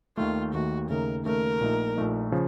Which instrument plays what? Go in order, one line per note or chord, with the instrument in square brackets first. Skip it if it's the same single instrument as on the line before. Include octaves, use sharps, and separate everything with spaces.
[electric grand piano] D#2 D#3 A3 [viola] F4
[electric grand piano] D#2 D#3 A3 [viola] F#4
[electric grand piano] D#2 C#3 A3 D#4 [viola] A#4
[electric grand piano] D#2 C#3 A3 D#4 [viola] A#4
[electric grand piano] A#1 A#2 A3 D#4
A#1 A#2 A3 D#4
C#3 F3